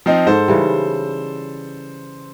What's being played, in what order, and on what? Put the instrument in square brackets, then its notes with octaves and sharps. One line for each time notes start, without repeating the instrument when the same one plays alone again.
[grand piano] F3 C4 D#4
[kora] G#2 [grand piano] A4 C5
[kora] C#3 E3 G3